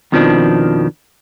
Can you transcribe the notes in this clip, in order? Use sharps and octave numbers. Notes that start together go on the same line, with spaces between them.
F2 B2 D#3 F3 D4